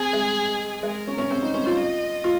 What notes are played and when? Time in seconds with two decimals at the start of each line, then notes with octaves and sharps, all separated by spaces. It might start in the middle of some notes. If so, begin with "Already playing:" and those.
Already playing: C4 G#4
0.13 G#3
0.83 G#3 A#4
1.07 C#4
1.18 C#4
1.30 C4 C5
1.42 D#4
1.54 C#4
1.66 F4
1.77 D#5
2.24 F4